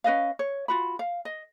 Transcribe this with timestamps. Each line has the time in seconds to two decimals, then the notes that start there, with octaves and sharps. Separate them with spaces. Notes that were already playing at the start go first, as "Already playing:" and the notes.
0.04 C#4 B4 D#5 F5
0.39 C#5
0.68 F4 F#4 B5
0.99 F5
1.25 D#5